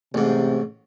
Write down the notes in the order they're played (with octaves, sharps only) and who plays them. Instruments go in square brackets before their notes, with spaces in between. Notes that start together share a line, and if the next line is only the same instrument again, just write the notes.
[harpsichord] A1 G#2 [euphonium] C3